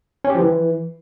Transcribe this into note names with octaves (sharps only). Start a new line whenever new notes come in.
C#4
G4
F3
E3